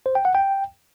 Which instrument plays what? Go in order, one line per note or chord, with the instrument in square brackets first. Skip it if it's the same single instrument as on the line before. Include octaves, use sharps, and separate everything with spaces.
[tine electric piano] C5
G5
F#5
G5